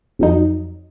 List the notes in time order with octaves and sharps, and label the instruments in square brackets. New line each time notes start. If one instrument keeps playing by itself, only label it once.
[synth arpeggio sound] F2 F#3 D#4